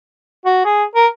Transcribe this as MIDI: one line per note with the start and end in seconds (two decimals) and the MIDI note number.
0.45 0.60 66
0.65 0.84 68
0.95 1.07 70